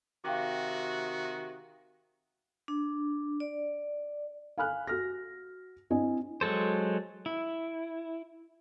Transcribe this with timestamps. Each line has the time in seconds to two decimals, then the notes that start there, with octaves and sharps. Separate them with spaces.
0.24 C3 D#3 F#4 F5 G5 D6
2.68 D4
3.40 D5
4.58 F5 G#5 B5 F6 F#6
4.87 F#4 F6 A#6
5.90 C4 D4 E4 D#5 G#5
6.41 F#3 G#3 A4 C5
7.26 E4